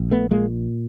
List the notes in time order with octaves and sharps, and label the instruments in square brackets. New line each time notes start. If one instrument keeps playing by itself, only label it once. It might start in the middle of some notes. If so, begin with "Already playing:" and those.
Already playing: [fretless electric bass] A#1
A3 B3
A#2 G#3 A#3